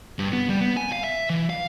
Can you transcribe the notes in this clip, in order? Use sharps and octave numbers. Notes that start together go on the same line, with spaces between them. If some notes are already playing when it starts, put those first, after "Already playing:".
G2
B3
G3
B3
G#5
F5
E5
E3
F5